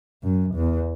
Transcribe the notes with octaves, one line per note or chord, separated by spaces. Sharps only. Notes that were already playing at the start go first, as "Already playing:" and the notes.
F#2
E2